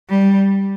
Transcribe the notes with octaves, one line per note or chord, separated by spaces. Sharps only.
G3